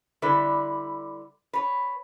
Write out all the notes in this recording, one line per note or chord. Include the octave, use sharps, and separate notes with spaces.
D3 G3 E4 B4
B4 C#5